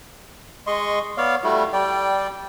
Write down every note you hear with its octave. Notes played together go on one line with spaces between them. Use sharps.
G#3 D#5 C6 C#6
B3 C#5 D5 F5
G3 A3 E4 F#4
G3 D5 G5